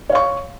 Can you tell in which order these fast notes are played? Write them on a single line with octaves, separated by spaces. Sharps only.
C#5 F5 C#6